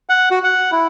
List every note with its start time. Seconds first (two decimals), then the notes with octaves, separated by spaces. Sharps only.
0.09 F#5
0.31 F#4
0.44 F#5
0.72 E4